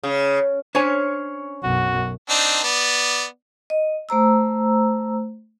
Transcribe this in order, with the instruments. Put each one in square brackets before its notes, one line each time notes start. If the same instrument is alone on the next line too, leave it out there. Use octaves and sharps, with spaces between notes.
[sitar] C#3
[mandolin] C#4 C#5 [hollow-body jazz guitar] D4 C5 G#5
[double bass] B1 F#2 [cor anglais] F#4
[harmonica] C4 D4 D#4
B3 D5
[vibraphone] D#5
A3 C5 A#5 E6